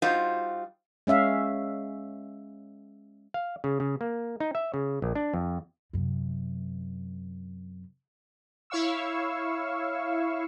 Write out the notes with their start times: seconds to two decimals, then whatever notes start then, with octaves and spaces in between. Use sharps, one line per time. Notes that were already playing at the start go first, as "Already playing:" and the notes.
0.02 G3 D#4 F4 F#4 C5
1.07 G#3 C#4 E5 F5
3.34 F5
3.64 C#3
3.80 C#3
4.01 A#3
4.40 D#4
4.55 E5
4.74 C#3
5.02 A#1
5.15 D4
5.34 F2
5.93 F#2 C3
8.70 E4 C#5 F5 C#6 E6